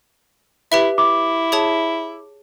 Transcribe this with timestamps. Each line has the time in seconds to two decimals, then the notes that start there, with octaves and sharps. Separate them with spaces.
0.72 E4 G4 B4 E5
0.98 E4 D6
1.52 G#4 C#5 A5